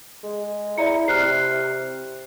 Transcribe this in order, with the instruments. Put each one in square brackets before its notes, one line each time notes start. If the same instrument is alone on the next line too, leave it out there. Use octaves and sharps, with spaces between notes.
[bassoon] G#3
[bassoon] E4 [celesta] D5 A#5 C#7
[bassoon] C3 [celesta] F6 F#6 C7